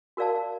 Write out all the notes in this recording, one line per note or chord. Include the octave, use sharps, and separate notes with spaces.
F#4 A#4 D5 F5 A5